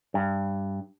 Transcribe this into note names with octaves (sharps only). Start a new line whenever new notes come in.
G2